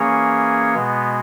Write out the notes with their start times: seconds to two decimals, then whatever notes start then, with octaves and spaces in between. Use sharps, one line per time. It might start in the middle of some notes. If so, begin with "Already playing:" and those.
Already playing: E3 A#3 C#4 G#4 C#5
0.74 B2 G#3 B3